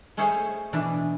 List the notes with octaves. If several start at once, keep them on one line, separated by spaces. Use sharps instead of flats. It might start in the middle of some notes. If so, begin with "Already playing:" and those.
G#3 A3 C#4 G#4 C5 C#5
B2 E3 D4